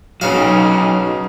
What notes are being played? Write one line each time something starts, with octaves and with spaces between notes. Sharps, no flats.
B1 C#3 F#3 D#4 F5